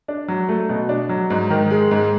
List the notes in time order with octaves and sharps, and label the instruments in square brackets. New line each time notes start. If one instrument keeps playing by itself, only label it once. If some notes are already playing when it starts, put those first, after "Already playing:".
[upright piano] D4
F#3
A3
B2
D4
F#3
G#2
D#3
G#3
G#2